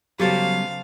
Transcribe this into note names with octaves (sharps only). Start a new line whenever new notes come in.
C#3 F#3 G3 B3 G4 A4 C5 F5